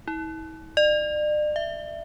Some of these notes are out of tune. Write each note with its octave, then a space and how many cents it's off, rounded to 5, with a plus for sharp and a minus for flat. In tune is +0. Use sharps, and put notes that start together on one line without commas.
E4 -45
D5 +40
E5 +20